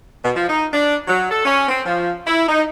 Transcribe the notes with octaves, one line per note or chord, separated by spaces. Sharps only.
B2
F3
D#4
D4
F#3
A4
C#4
C4
F3
E4
D#4